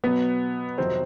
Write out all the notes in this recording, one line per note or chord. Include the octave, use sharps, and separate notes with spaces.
B2 F#3 B3
F2 C3 D#3 F#3 C4